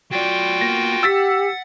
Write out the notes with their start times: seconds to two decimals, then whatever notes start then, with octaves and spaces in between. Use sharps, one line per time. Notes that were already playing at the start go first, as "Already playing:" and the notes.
0.11 F#3 F4 F#4 D5 G5
0.61 A#3 B3 A#6
1.03 G4 F#5 E6 A6 B6